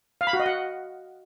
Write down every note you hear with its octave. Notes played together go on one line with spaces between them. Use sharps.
F5
B5
F#4
D#5
F#5